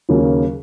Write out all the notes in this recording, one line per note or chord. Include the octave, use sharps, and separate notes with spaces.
D#2 C#3 F#3 A#3 C#4